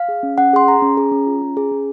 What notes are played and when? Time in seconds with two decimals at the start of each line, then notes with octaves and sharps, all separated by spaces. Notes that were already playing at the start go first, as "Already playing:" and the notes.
Already playing: F5
0.09 G#4
0.23 C#4
0.38 C#4 F#5
0.53 G#4 C6
0.68 G#4 A#5
0.82 C#4
0.97 G#4
1.12 C#4
1.27 F4
1.42 C#4
1.57 G#4
1.72 C#4